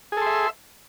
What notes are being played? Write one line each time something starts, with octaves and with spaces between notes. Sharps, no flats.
G#4 A4 E5 C6